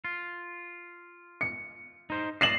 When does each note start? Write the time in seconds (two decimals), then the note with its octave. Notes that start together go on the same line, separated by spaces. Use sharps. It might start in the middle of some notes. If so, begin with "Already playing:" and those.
0.05 F4
1.41 C#7
2.10 D#4 C5
2.41 D5 D#5 C7 E7 F#7